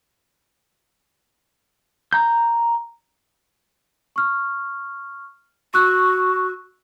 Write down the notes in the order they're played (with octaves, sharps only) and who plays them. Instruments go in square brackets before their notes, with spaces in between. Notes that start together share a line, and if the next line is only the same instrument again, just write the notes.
[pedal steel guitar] A#5 G6
[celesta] C#6 F6
[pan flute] F#4 [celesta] C#6 E6 F#6